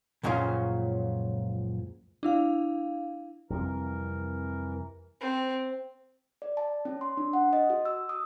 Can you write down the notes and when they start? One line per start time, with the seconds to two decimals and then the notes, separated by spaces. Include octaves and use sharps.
0.23 C#2 F#2 A#2 F3 C#4 F5
2.23 D4 E4 F5
3.50 F2 C3 E3 G3 A#4
5.21 C4
6.42 D5
6.57 A5
6.85 C#4
7.01 C6
7.17 D4
7.33 F#5
7.53 D#5
7.70 F#4
7.85 E6
8.09 D#6